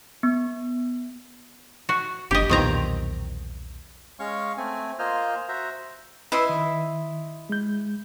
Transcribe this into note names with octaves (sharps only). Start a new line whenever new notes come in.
B3
F#4
F#1 D4 G4 D#5
B1 E2 A#2 D#3 C4 A#5
G#3 C#4 C#5 F5 C#6
A3 C4 G#5
A#3 F4 C5 D#5 G#5 F6
F#4 C5 E5 A#5
E4 B4 D#5 C6 E6
D#3
G#3 G6